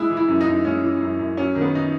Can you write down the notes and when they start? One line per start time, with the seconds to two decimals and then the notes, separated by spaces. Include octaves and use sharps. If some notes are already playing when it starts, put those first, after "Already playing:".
Already playing: G#3 E4
0.10 E3
0.17 E4
0.28 F#2
0.41 D#4
0.47 F#2
0.65 G#3 C#4
0.83 E3
1.02 F#2
1.19 F#2
1.37 F#3 C#4
1.55 D#3
1.61 B3
1.75 D#4